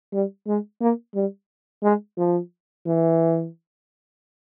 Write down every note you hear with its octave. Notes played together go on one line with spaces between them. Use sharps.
G3
G#3
A#3
G3
G#3
F3
E3